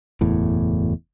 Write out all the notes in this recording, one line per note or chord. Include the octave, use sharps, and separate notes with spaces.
F#1 E2 A2